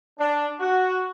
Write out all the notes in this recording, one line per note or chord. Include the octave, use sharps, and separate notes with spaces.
D4
F#4